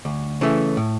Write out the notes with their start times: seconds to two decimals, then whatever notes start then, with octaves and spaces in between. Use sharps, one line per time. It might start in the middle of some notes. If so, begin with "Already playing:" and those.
0.05 D2
0.41 C#3 E3 A3
0.77 A2